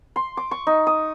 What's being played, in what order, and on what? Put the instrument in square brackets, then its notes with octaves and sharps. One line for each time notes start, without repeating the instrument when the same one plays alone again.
[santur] C6
D6
C#6
D#4
D#6